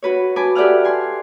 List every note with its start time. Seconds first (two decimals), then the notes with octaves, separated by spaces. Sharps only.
0.03 F#4 B4 C#5
0.36 B4 G#5 A5 D6
0.55 G4 A4 D5 E5 F#5 F6
0.84 G#5 C6